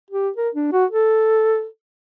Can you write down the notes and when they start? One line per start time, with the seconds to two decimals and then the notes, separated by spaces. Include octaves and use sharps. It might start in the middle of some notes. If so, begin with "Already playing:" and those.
0.11 G4
0.37 A#4
0.55 D4
0.73 F#4
0.91 A4